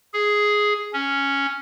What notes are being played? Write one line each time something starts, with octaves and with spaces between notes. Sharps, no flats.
G#4
C#4